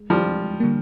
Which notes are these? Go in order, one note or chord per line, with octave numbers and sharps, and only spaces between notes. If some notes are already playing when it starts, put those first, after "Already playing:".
Already playing: G#3
F3 G3
D3 G3 A#3